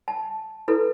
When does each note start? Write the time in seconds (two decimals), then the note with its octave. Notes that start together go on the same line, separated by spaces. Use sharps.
0.08 A5
0.68 E4 A4 B4